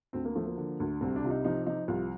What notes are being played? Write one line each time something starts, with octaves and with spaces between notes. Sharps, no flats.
D2 C4
A#3
F3 A3
A#3
D3
D2
C2 C4
D4
C3 F4
D#4
F3 D#4
F3 D#4
C2 F4